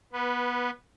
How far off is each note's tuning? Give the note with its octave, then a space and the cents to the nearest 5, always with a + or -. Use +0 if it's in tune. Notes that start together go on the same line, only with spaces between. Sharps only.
B3 -20 B4 +0